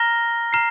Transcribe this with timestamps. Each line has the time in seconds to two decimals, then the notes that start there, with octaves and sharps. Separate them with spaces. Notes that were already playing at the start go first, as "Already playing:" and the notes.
Already playing: A#5 F6 A#6 G7
0.53 A#5 F6 C7